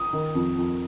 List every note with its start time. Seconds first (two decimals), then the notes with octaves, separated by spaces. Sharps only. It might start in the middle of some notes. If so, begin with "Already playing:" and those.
Already playing: D#6
0.13 D#3
0.35 F2
0.58 F2